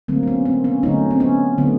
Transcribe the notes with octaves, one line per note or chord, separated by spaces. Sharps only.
D3 F#3 A3 A#3 C4
C4
B3 C#4
A#3 C4
B3 C#4
D3 F#3 A3 C#4 D#4
C4
B3 C#4
D3 F#3 A3 B3